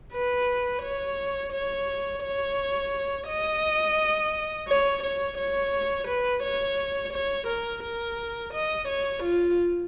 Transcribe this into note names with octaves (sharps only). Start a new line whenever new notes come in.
B4
C#5
C#5
C#5
D#5
C#5
C#5
C#5
B4
C#5
C#5
A#4
A#4
D#5
C#5
F4